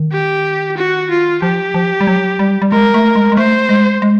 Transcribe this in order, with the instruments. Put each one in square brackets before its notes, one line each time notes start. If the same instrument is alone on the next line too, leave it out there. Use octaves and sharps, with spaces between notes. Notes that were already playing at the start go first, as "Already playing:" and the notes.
Already playing: [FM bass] D#3
[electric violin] G4
F#4
F4
[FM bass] F3 [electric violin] G4
[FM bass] F3
G3
F#3
G3
G3
[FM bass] G#3 [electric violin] A#4
[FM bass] A3
G#3
G#3
[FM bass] A3 [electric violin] C5
[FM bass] G#3
G#3